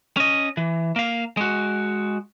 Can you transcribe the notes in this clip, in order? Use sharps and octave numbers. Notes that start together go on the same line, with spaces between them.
C#4 D#5
E3
A#3 F5
G#3 F#4